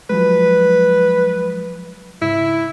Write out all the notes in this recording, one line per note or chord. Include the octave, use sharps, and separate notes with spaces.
F3 F#3 G#3 B4
G#2 C#3 E4